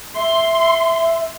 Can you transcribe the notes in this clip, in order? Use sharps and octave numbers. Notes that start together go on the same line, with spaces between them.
E5 C6